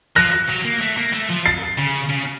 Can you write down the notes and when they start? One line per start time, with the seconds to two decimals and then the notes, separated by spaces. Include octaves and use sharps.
0.16 F3 F#6 A#6
0.49 F#3
0.65 A#3
0.81 A3
0.97 A#3
1.13 A3
1.29 F3
1.46 A6 C7
1.78 C#3
2.10 C#3